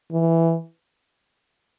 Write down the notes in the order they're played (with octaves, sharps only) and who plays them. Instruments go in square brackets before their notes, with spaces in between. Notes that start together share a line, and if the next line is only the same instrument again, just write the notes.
[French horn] E3